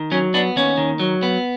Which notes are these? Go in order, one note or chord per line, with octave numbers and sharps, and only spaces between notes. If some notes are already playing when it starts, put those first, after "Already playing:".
Already playing: D#3
F#3 C#4
B3 D4
D#2 C#4
D#3
F#3
B3